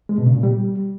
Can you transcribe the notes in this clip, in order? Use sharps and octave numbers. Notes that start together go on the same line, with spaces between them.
G#3
B2
C#3
A#2
G3